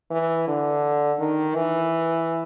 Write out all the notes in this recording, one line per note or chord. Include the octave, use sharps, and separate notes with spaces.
E3
D3
D#3
E3